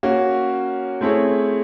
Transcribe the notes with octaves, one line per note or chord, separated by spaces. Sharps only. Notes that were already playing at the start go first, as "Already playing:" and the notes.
A#3 C#4 F#4
A3 C4 E4 G#4 C#5